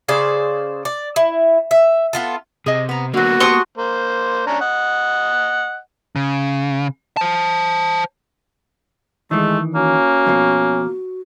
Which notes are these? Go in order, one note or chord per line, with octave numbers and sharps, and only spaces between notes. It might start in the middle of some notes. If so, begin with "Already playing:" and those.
C#3 G#4 C5 D5
D5
E4
E5
B3 F4 A4
C3 G#4 D#5
B3 A#5
D3 F#3 A#3 B3 F#4
G4 A5 C6 C#6 D#6
A#3 C5
C#4 D4 A#5
D#5 F#5
C#3
C5 A5
D#3 E3 G#3 A3
A#3 C#4 F#4
F2 B2 F3